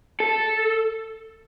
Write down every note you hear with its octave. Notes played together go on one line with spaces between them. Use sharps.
A4